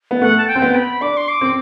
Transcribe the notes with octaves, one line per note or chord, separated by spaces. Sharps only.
B3
A3 F#5
A5
G5
C4
B3
B5
D4 D6
C6
D6
C4